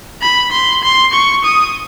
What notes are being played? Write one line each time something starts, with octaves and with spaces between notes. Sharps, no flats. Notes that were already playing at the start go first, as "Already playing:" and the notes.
B5
C6
C6
C#6
D#6